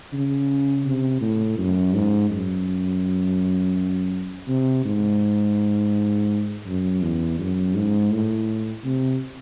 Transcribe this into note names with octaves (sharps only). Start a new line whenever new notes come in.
C#3
C3
A2
F#2
G#2
F#2
C3
G#2
F#2
E2
F#2
G#2
A2
C3